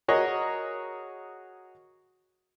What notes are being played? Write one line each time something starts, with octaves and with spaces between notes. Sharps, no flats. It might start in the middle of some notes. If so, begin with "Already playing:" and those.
F#4 G#4 A#4 C#5 D#5